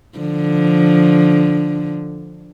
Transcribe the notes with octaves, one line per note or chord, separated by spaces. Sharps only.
D3 F3